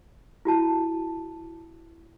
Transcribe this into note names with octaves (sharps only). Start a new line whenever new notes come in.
E4 F#4 A5